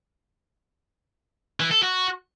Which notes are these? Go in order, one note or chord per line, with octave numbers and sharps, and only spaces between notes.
E3
A4
F#4